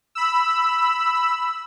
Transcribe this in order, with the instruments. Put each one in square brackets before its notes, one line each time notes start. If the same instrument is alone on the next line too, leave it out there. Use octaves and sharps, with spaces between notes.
[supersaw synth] B5 E6